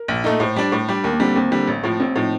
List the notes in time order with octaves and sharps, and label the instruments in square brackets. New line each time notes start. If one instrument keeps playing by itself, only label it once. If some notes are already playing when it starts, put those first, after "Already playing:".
Already playing: [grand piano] A#4
[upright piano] A#1
A#2 A3 D#4
[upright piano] A2 [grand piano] C5
[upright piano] G3 D4
A2
G3 D4
[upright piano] D#2 [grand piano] A#4
[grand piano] A#3
[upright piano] G3 [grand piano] C4
[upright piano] D3
[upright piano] D#2 [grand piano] C4
[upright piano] D3 G3
A1
A2 F3
[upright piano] A1 [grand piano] C4
[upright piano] A2 F3 [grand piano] D#4